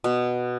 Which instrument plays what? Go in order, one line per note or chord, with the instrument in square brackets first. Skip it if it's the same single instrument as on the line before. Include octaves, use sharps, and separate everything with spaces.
[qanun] B2